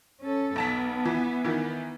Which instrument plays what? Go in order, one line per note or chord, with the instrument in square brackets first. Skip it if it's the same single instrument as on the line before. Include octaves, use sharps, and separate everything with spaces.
[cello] C#4 A4
[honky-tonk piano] B1 A5 B6 [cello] B3
[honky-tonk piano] E3
D#3 E3